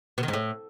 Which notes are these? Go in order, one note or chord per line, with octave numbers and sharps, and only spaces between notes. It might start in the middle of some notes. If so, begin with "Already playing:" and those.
B2
D#3
G#2
A2